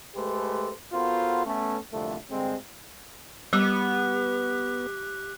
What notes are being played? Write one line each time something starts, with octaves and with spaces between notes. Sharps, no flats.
G#3 A3 G4 A4 B4 C5
B3 F4 F#4 A4 A#4 C5
A3 B3 C#4
C2 F2 A#2 D3 A3
G2 D3 G#3 C4
G3 B3 G4 D6 F#6